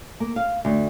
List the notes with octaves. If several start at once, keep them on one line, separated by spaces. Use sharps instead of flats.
A#3
F5
D2